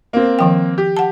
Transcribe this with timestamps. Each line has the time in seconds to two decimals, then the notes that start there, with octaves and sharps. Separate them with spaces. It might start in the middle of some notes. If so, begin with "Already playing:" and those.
0.13 A#3 C4
0.39 D#3 F3 G5
0.78 G4
0.97 F#5 A5